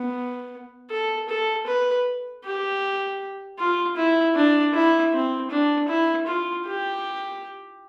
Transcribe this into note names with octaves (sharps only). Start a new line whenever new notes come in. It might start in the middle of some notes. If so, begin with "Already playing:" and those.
Already playing: B3
A4
A4
B4
G4
F4
E4
D4
E4
C4
D4
E4
F4
G4